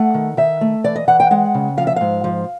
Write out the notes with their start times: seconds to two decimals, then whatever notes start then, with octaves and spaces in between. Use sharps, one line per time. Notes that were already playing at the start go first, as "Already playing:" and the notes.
Already playing: A3 F#5
0.14 D#3
0.37 D#3 E5
0.61 A3
0.84 E3 D5
0.96 D#5
1.08 E3 F#5
1.20 G5
1.31 G#3 F#5
1.54 C#3
1.77 F3 F5
1.87 E5
1.96 G#2 F5
2.24 F3